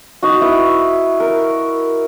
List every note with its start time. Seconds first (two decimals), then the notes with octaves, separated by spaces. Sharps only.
0.23 D#4 F#4
0.41 E4 B4
1.20 A#4